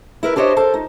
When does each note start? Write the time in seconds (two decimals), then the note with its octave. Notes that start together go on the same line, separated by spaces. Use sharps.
0.23 E4 A#4 B4
0.36 D4 G4 C5 C#5 D#5
0.56 A4 A#4 C5 A5
0.74 D#4